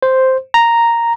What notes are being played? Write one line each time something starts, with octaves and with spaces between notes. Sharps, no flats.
C5
A#5